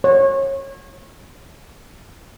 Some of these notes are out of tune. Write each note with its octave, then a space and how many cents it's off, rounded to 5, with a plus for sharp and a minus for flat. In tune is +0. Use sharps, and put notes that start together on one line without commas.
C#5 -30